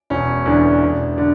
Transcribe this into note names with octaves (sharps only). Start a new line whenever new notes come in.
E1 C#4
E2 D3 D4
E1
D3